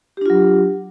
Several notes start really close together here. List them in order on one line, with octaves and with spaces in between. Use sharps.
G4 D4 F4 F#3